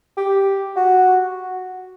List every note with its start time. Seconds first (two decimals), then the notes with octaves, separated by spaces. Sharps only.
0.17 G4
0.76 F#4